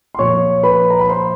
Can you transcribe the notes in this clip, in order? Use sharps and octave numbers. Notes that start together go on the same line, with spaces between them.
C6
A#2 F3 C#5 C#6
B4 B5
A#5
B5
C5 C6